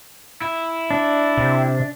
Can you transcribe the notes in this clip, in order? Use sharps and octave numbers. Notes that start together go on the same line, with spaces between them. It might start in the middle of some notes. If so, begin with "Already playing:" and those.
E4
D4
C3